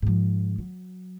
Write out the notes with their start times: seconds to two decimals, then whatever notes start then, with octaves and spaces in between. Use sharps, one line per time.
0.02 G#2 F3
0.58 F#3